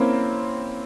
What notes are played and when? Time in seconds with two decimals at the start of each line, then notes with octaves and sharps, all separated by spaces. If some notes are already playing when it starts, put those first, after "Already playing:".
Already playing: A#3 C4 C#4 E4